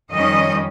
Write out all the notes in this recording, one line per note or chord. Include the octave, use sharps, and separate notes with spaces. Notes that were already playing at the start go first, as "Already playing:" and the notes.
F2 D#3 G3 C#4 D#5